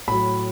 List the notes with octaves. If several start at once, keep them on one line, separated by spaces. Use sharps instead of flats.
A2 F#3 B5